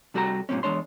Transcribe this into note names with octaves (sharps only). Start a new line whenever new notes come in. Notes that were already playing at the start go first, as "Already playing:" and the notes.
C3 G3 F#4 A4 G5 A#5
G2 A#2 G3 C4 C#4
E2 G#3 D4 C#5 C6